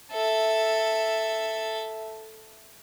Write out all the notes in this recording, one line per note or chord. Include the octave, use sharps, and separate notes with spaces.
A4 E5